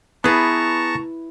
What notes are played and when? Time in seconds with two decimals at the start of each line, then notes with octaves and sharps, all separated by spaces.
0.24 B3 E4 G#4 B4 A5 A#5 C#6